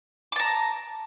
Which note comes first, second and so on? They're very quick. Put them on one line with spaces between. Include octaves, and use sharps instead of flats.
D6 A5 A#5